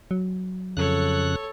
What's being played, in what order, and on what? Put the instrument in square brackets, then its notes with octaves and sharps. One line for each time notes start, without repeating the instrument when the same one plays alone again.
[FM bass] F#3
[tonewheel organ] F2 C#3 F#6 [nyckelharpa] A4 C#5